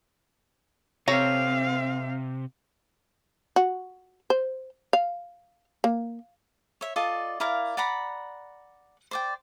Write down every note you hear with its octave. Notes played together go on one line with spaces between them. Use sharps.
C3 C4 A4 C#5 F5 A#5
F#4
C5
F5
A#3
C#5 E5
F4 A4 D5 D#5
E4 A#4 D5 F5
D5 F#5 A#5 B5
C5 D5 G5